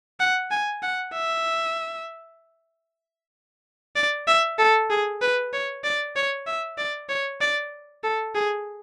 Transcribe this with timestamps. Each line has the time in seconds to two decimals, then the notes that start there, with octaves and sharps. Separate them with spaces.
0.20 F#5
0.51 G#5
0.82 F#5
1.14 E5
3.96 D5
4.27 E5
4.59 A4
4.90 G#4
5.21 B4
5.53 C#5
5.84 D5
6.16 C#5
6.46 E5
6.78 D5
7.09 C#5
7.41 D5
8.03 A4
8.35 G#4